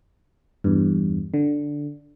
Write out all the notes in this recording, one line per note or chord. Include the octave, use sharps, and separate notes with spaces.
E2 G2
D3